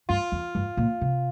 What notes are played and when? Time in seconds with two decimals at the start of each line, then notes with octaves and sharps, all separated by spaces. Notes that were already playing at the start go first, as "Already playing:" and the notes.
0.09 G2 F4
0.32 F2
0.55 G2
0.77 A#2
1.01 C3